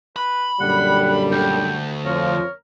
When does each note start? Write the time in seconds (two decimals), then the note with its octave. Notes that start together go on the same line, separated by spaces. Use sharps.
0.16 B4 B5
0.61 F#2 A#2 D3 G3 F#5
1.32 D2 G5
2.06 F2 F3 A#4 C#5